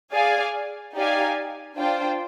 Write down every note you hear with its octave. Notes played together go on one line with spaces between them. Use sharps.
G#4 D5 F5 G#5
D#4 G4 D5 F5 G#5
D4 F4 C5 G5